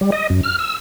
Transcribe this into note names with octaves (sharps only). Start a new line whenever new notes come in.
G3
D#5
F#2
F6
E6